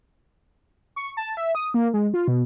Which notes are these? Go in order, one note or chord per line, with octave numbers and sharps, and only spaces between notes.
C#6
A5
E5
D#6
A#3
G#3
F4
B2